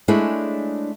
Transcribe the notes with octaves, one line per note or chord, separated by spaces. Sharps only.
G#3 A3 D4 E4 G#4 C#5